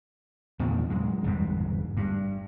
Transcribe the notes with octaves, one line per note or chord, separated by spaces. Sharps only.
E2 A#2 D3 D#3
F#2 G#3
G1 E2 G#2 B2
G2